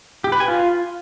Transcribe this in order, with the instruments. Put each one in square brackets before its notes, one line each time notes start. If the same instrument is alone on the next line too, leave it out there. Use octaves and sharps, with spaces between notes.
[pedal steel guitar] G4
B4
G#5
F4